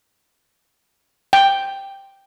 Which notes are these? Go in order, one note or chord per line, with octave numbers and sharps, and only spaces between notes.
G5